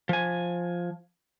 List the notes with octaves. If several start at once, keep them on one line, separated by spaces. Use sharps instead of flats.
F3 G#5